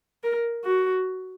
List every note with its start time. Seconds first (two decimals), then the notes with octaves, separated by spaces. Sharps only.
0.24 A#4
0.65 F#4